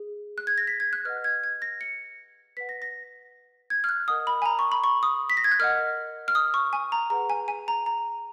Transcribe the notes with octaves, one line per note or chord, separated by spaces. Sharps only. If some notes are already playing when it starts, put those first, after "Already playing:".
Already playing: G#4
F#6
G#6
A#6
B6
G#6
F#6
B4 D#5 F#5 F6
G#6
G#6
A#6
C#7
B4 F#5 B6
A#6
A#6
G#6
F6
F#6
A#4 D#5 F#5 D#6
B5
G#5
A#5
C#6
B5
C#6
D#6
B6
A#6
G#6
F#6
A#4 D#5 F#5 F6
F6
D#6
C#6
G#5
A#5
G#4 B4 F#5 A#5
G#5
G#5
A#5
A#5